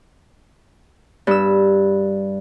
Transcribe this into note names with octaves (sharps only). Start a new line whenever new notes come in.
G2 E6